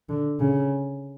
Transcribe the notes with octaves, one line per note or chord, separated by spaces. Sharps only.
D3
C#3